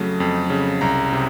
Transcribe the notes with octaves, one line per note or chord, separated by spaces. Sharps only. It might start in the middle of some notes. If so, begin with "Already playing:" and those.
Already playing: F2 C#3 F#3 A3
F2
C#3
C2 A#5
C3